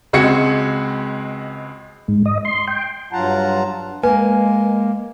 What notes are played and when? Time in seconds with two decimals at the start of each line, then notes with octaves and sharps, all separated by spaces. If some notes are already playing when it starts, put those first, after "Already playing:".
0.13 C#2 G#3 C4 F#4 G#6 C#7
2.08 G#2
2.25 D#5
2.45 C6
2.68 G5
3.13 G2 F#3 F4 F#5 A5 A#5
4.03 G#3 A#3 B4 G#5